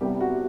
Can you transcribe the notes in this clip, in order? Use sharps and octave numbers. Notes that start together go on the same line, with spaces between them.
C2 C3 G3 B3 G4
F#4